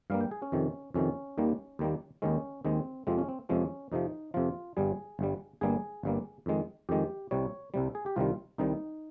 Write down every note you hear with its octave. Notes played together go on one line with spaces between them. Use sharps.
G2 G3 A#3 F5
G5
G#4
C#4
F2 C3 D#3
F2 C3 D#3 C#4
D#2 D#3 G3 A#3
D#2 D#3 G3 A#3
D#2 D#3 G#3 C#4
D#2 D#3 G#3 C4
F2 C3 F3 G#3 C4
C#4
C4
F2 C3 F3 G#3 C#4
F2 C3 F3 D#4
F2 C3 F3 F4
G1 G2 G3 G#4
G1 G2 G3
G1 G2 G3 A#3 G#4
G1 G2 G3 A#3
F2 D#3 G#3
F2 D#3 G#3 G4
C2 C3 G3 C#5
C2 C3 G3
G#4
G4
C2 C3 D#3 G3 F4
C2 C3 D#3 G3 D#4